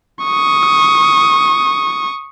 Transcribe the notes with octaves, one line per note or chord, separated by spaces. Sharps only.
C#6 D#6